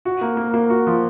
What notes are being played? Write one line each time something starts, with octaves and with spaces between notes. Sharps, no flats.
F#4
A#3
A#3
A#3
F#4
F3